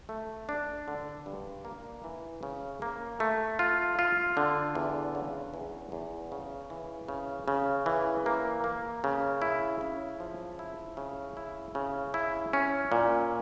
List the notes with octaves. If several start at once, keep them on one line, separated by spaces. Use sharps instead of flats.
A3
D4
D3
G2
A#3
E3
C#3
A#3
A3
F4
F4
D3
E2
C#3
E2
E2
C#3
E3
C#3
C#3
E3
A#3
A#3
C#3
E4
C#3
F3
E4
C#3
E4
C#3
E4
C#4
A#2